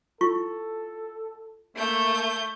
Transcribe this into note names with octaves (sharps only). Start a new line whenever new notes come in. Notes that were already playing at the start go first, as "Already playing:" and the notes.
E4 F4 A4 C#6
A3 A#3 G6